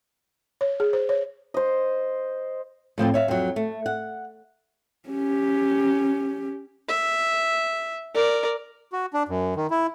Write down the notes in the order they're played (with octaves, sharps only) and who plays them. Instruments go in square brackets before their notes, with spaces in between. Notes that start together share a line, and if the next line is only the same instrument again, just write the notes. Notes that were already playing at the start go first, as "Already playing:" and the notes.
[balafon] C#5
G#4
C5
C#5
[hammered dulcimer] C5 D#5
[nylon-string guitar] A2 F3 C4 F4
C#5 E5 F5
F2 F#3
A3
F#5
[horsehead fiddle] C#4 G4
[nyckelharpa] E5
A#4 D5
[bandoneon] F#4
D4
F#2
D#3
E4